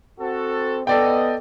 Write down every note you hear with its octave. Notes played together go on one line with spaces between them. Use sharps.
C4 F#4 A4
B3 A4 D5 D#5 G5